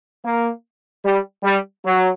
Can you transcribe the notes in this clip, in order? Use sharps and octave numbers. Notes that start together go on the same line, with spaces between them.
A#3
G3
G3
F#3